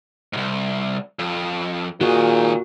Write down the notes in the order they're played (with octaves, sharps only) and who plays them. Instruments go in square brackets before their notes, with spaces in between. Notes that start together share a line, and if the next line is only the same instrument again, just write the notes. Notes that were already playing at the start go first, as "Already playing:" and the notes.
[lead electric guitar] C2 G#2
F2
[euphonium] A#2 [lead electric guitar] D#3 G#4 [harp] F#4